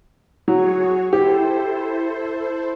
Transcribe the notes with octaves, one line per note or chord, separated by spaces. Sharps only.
F#3 F#4 G#4 C#5
E4 G4 A4 C5